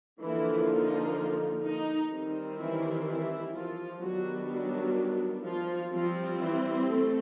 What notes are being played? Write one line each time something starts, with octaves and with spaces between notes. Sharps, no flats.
D3 E3 F3 A#3 E4
D#4
D#4
D#3 G3 C4 D#4
E3 E4
E3 E4
F3 F4
D#3 F#3 G3 B3 D4 F#4
F#3 F#4
F3 F4
F3 G3 C4 F4
E3 E4
A3 A4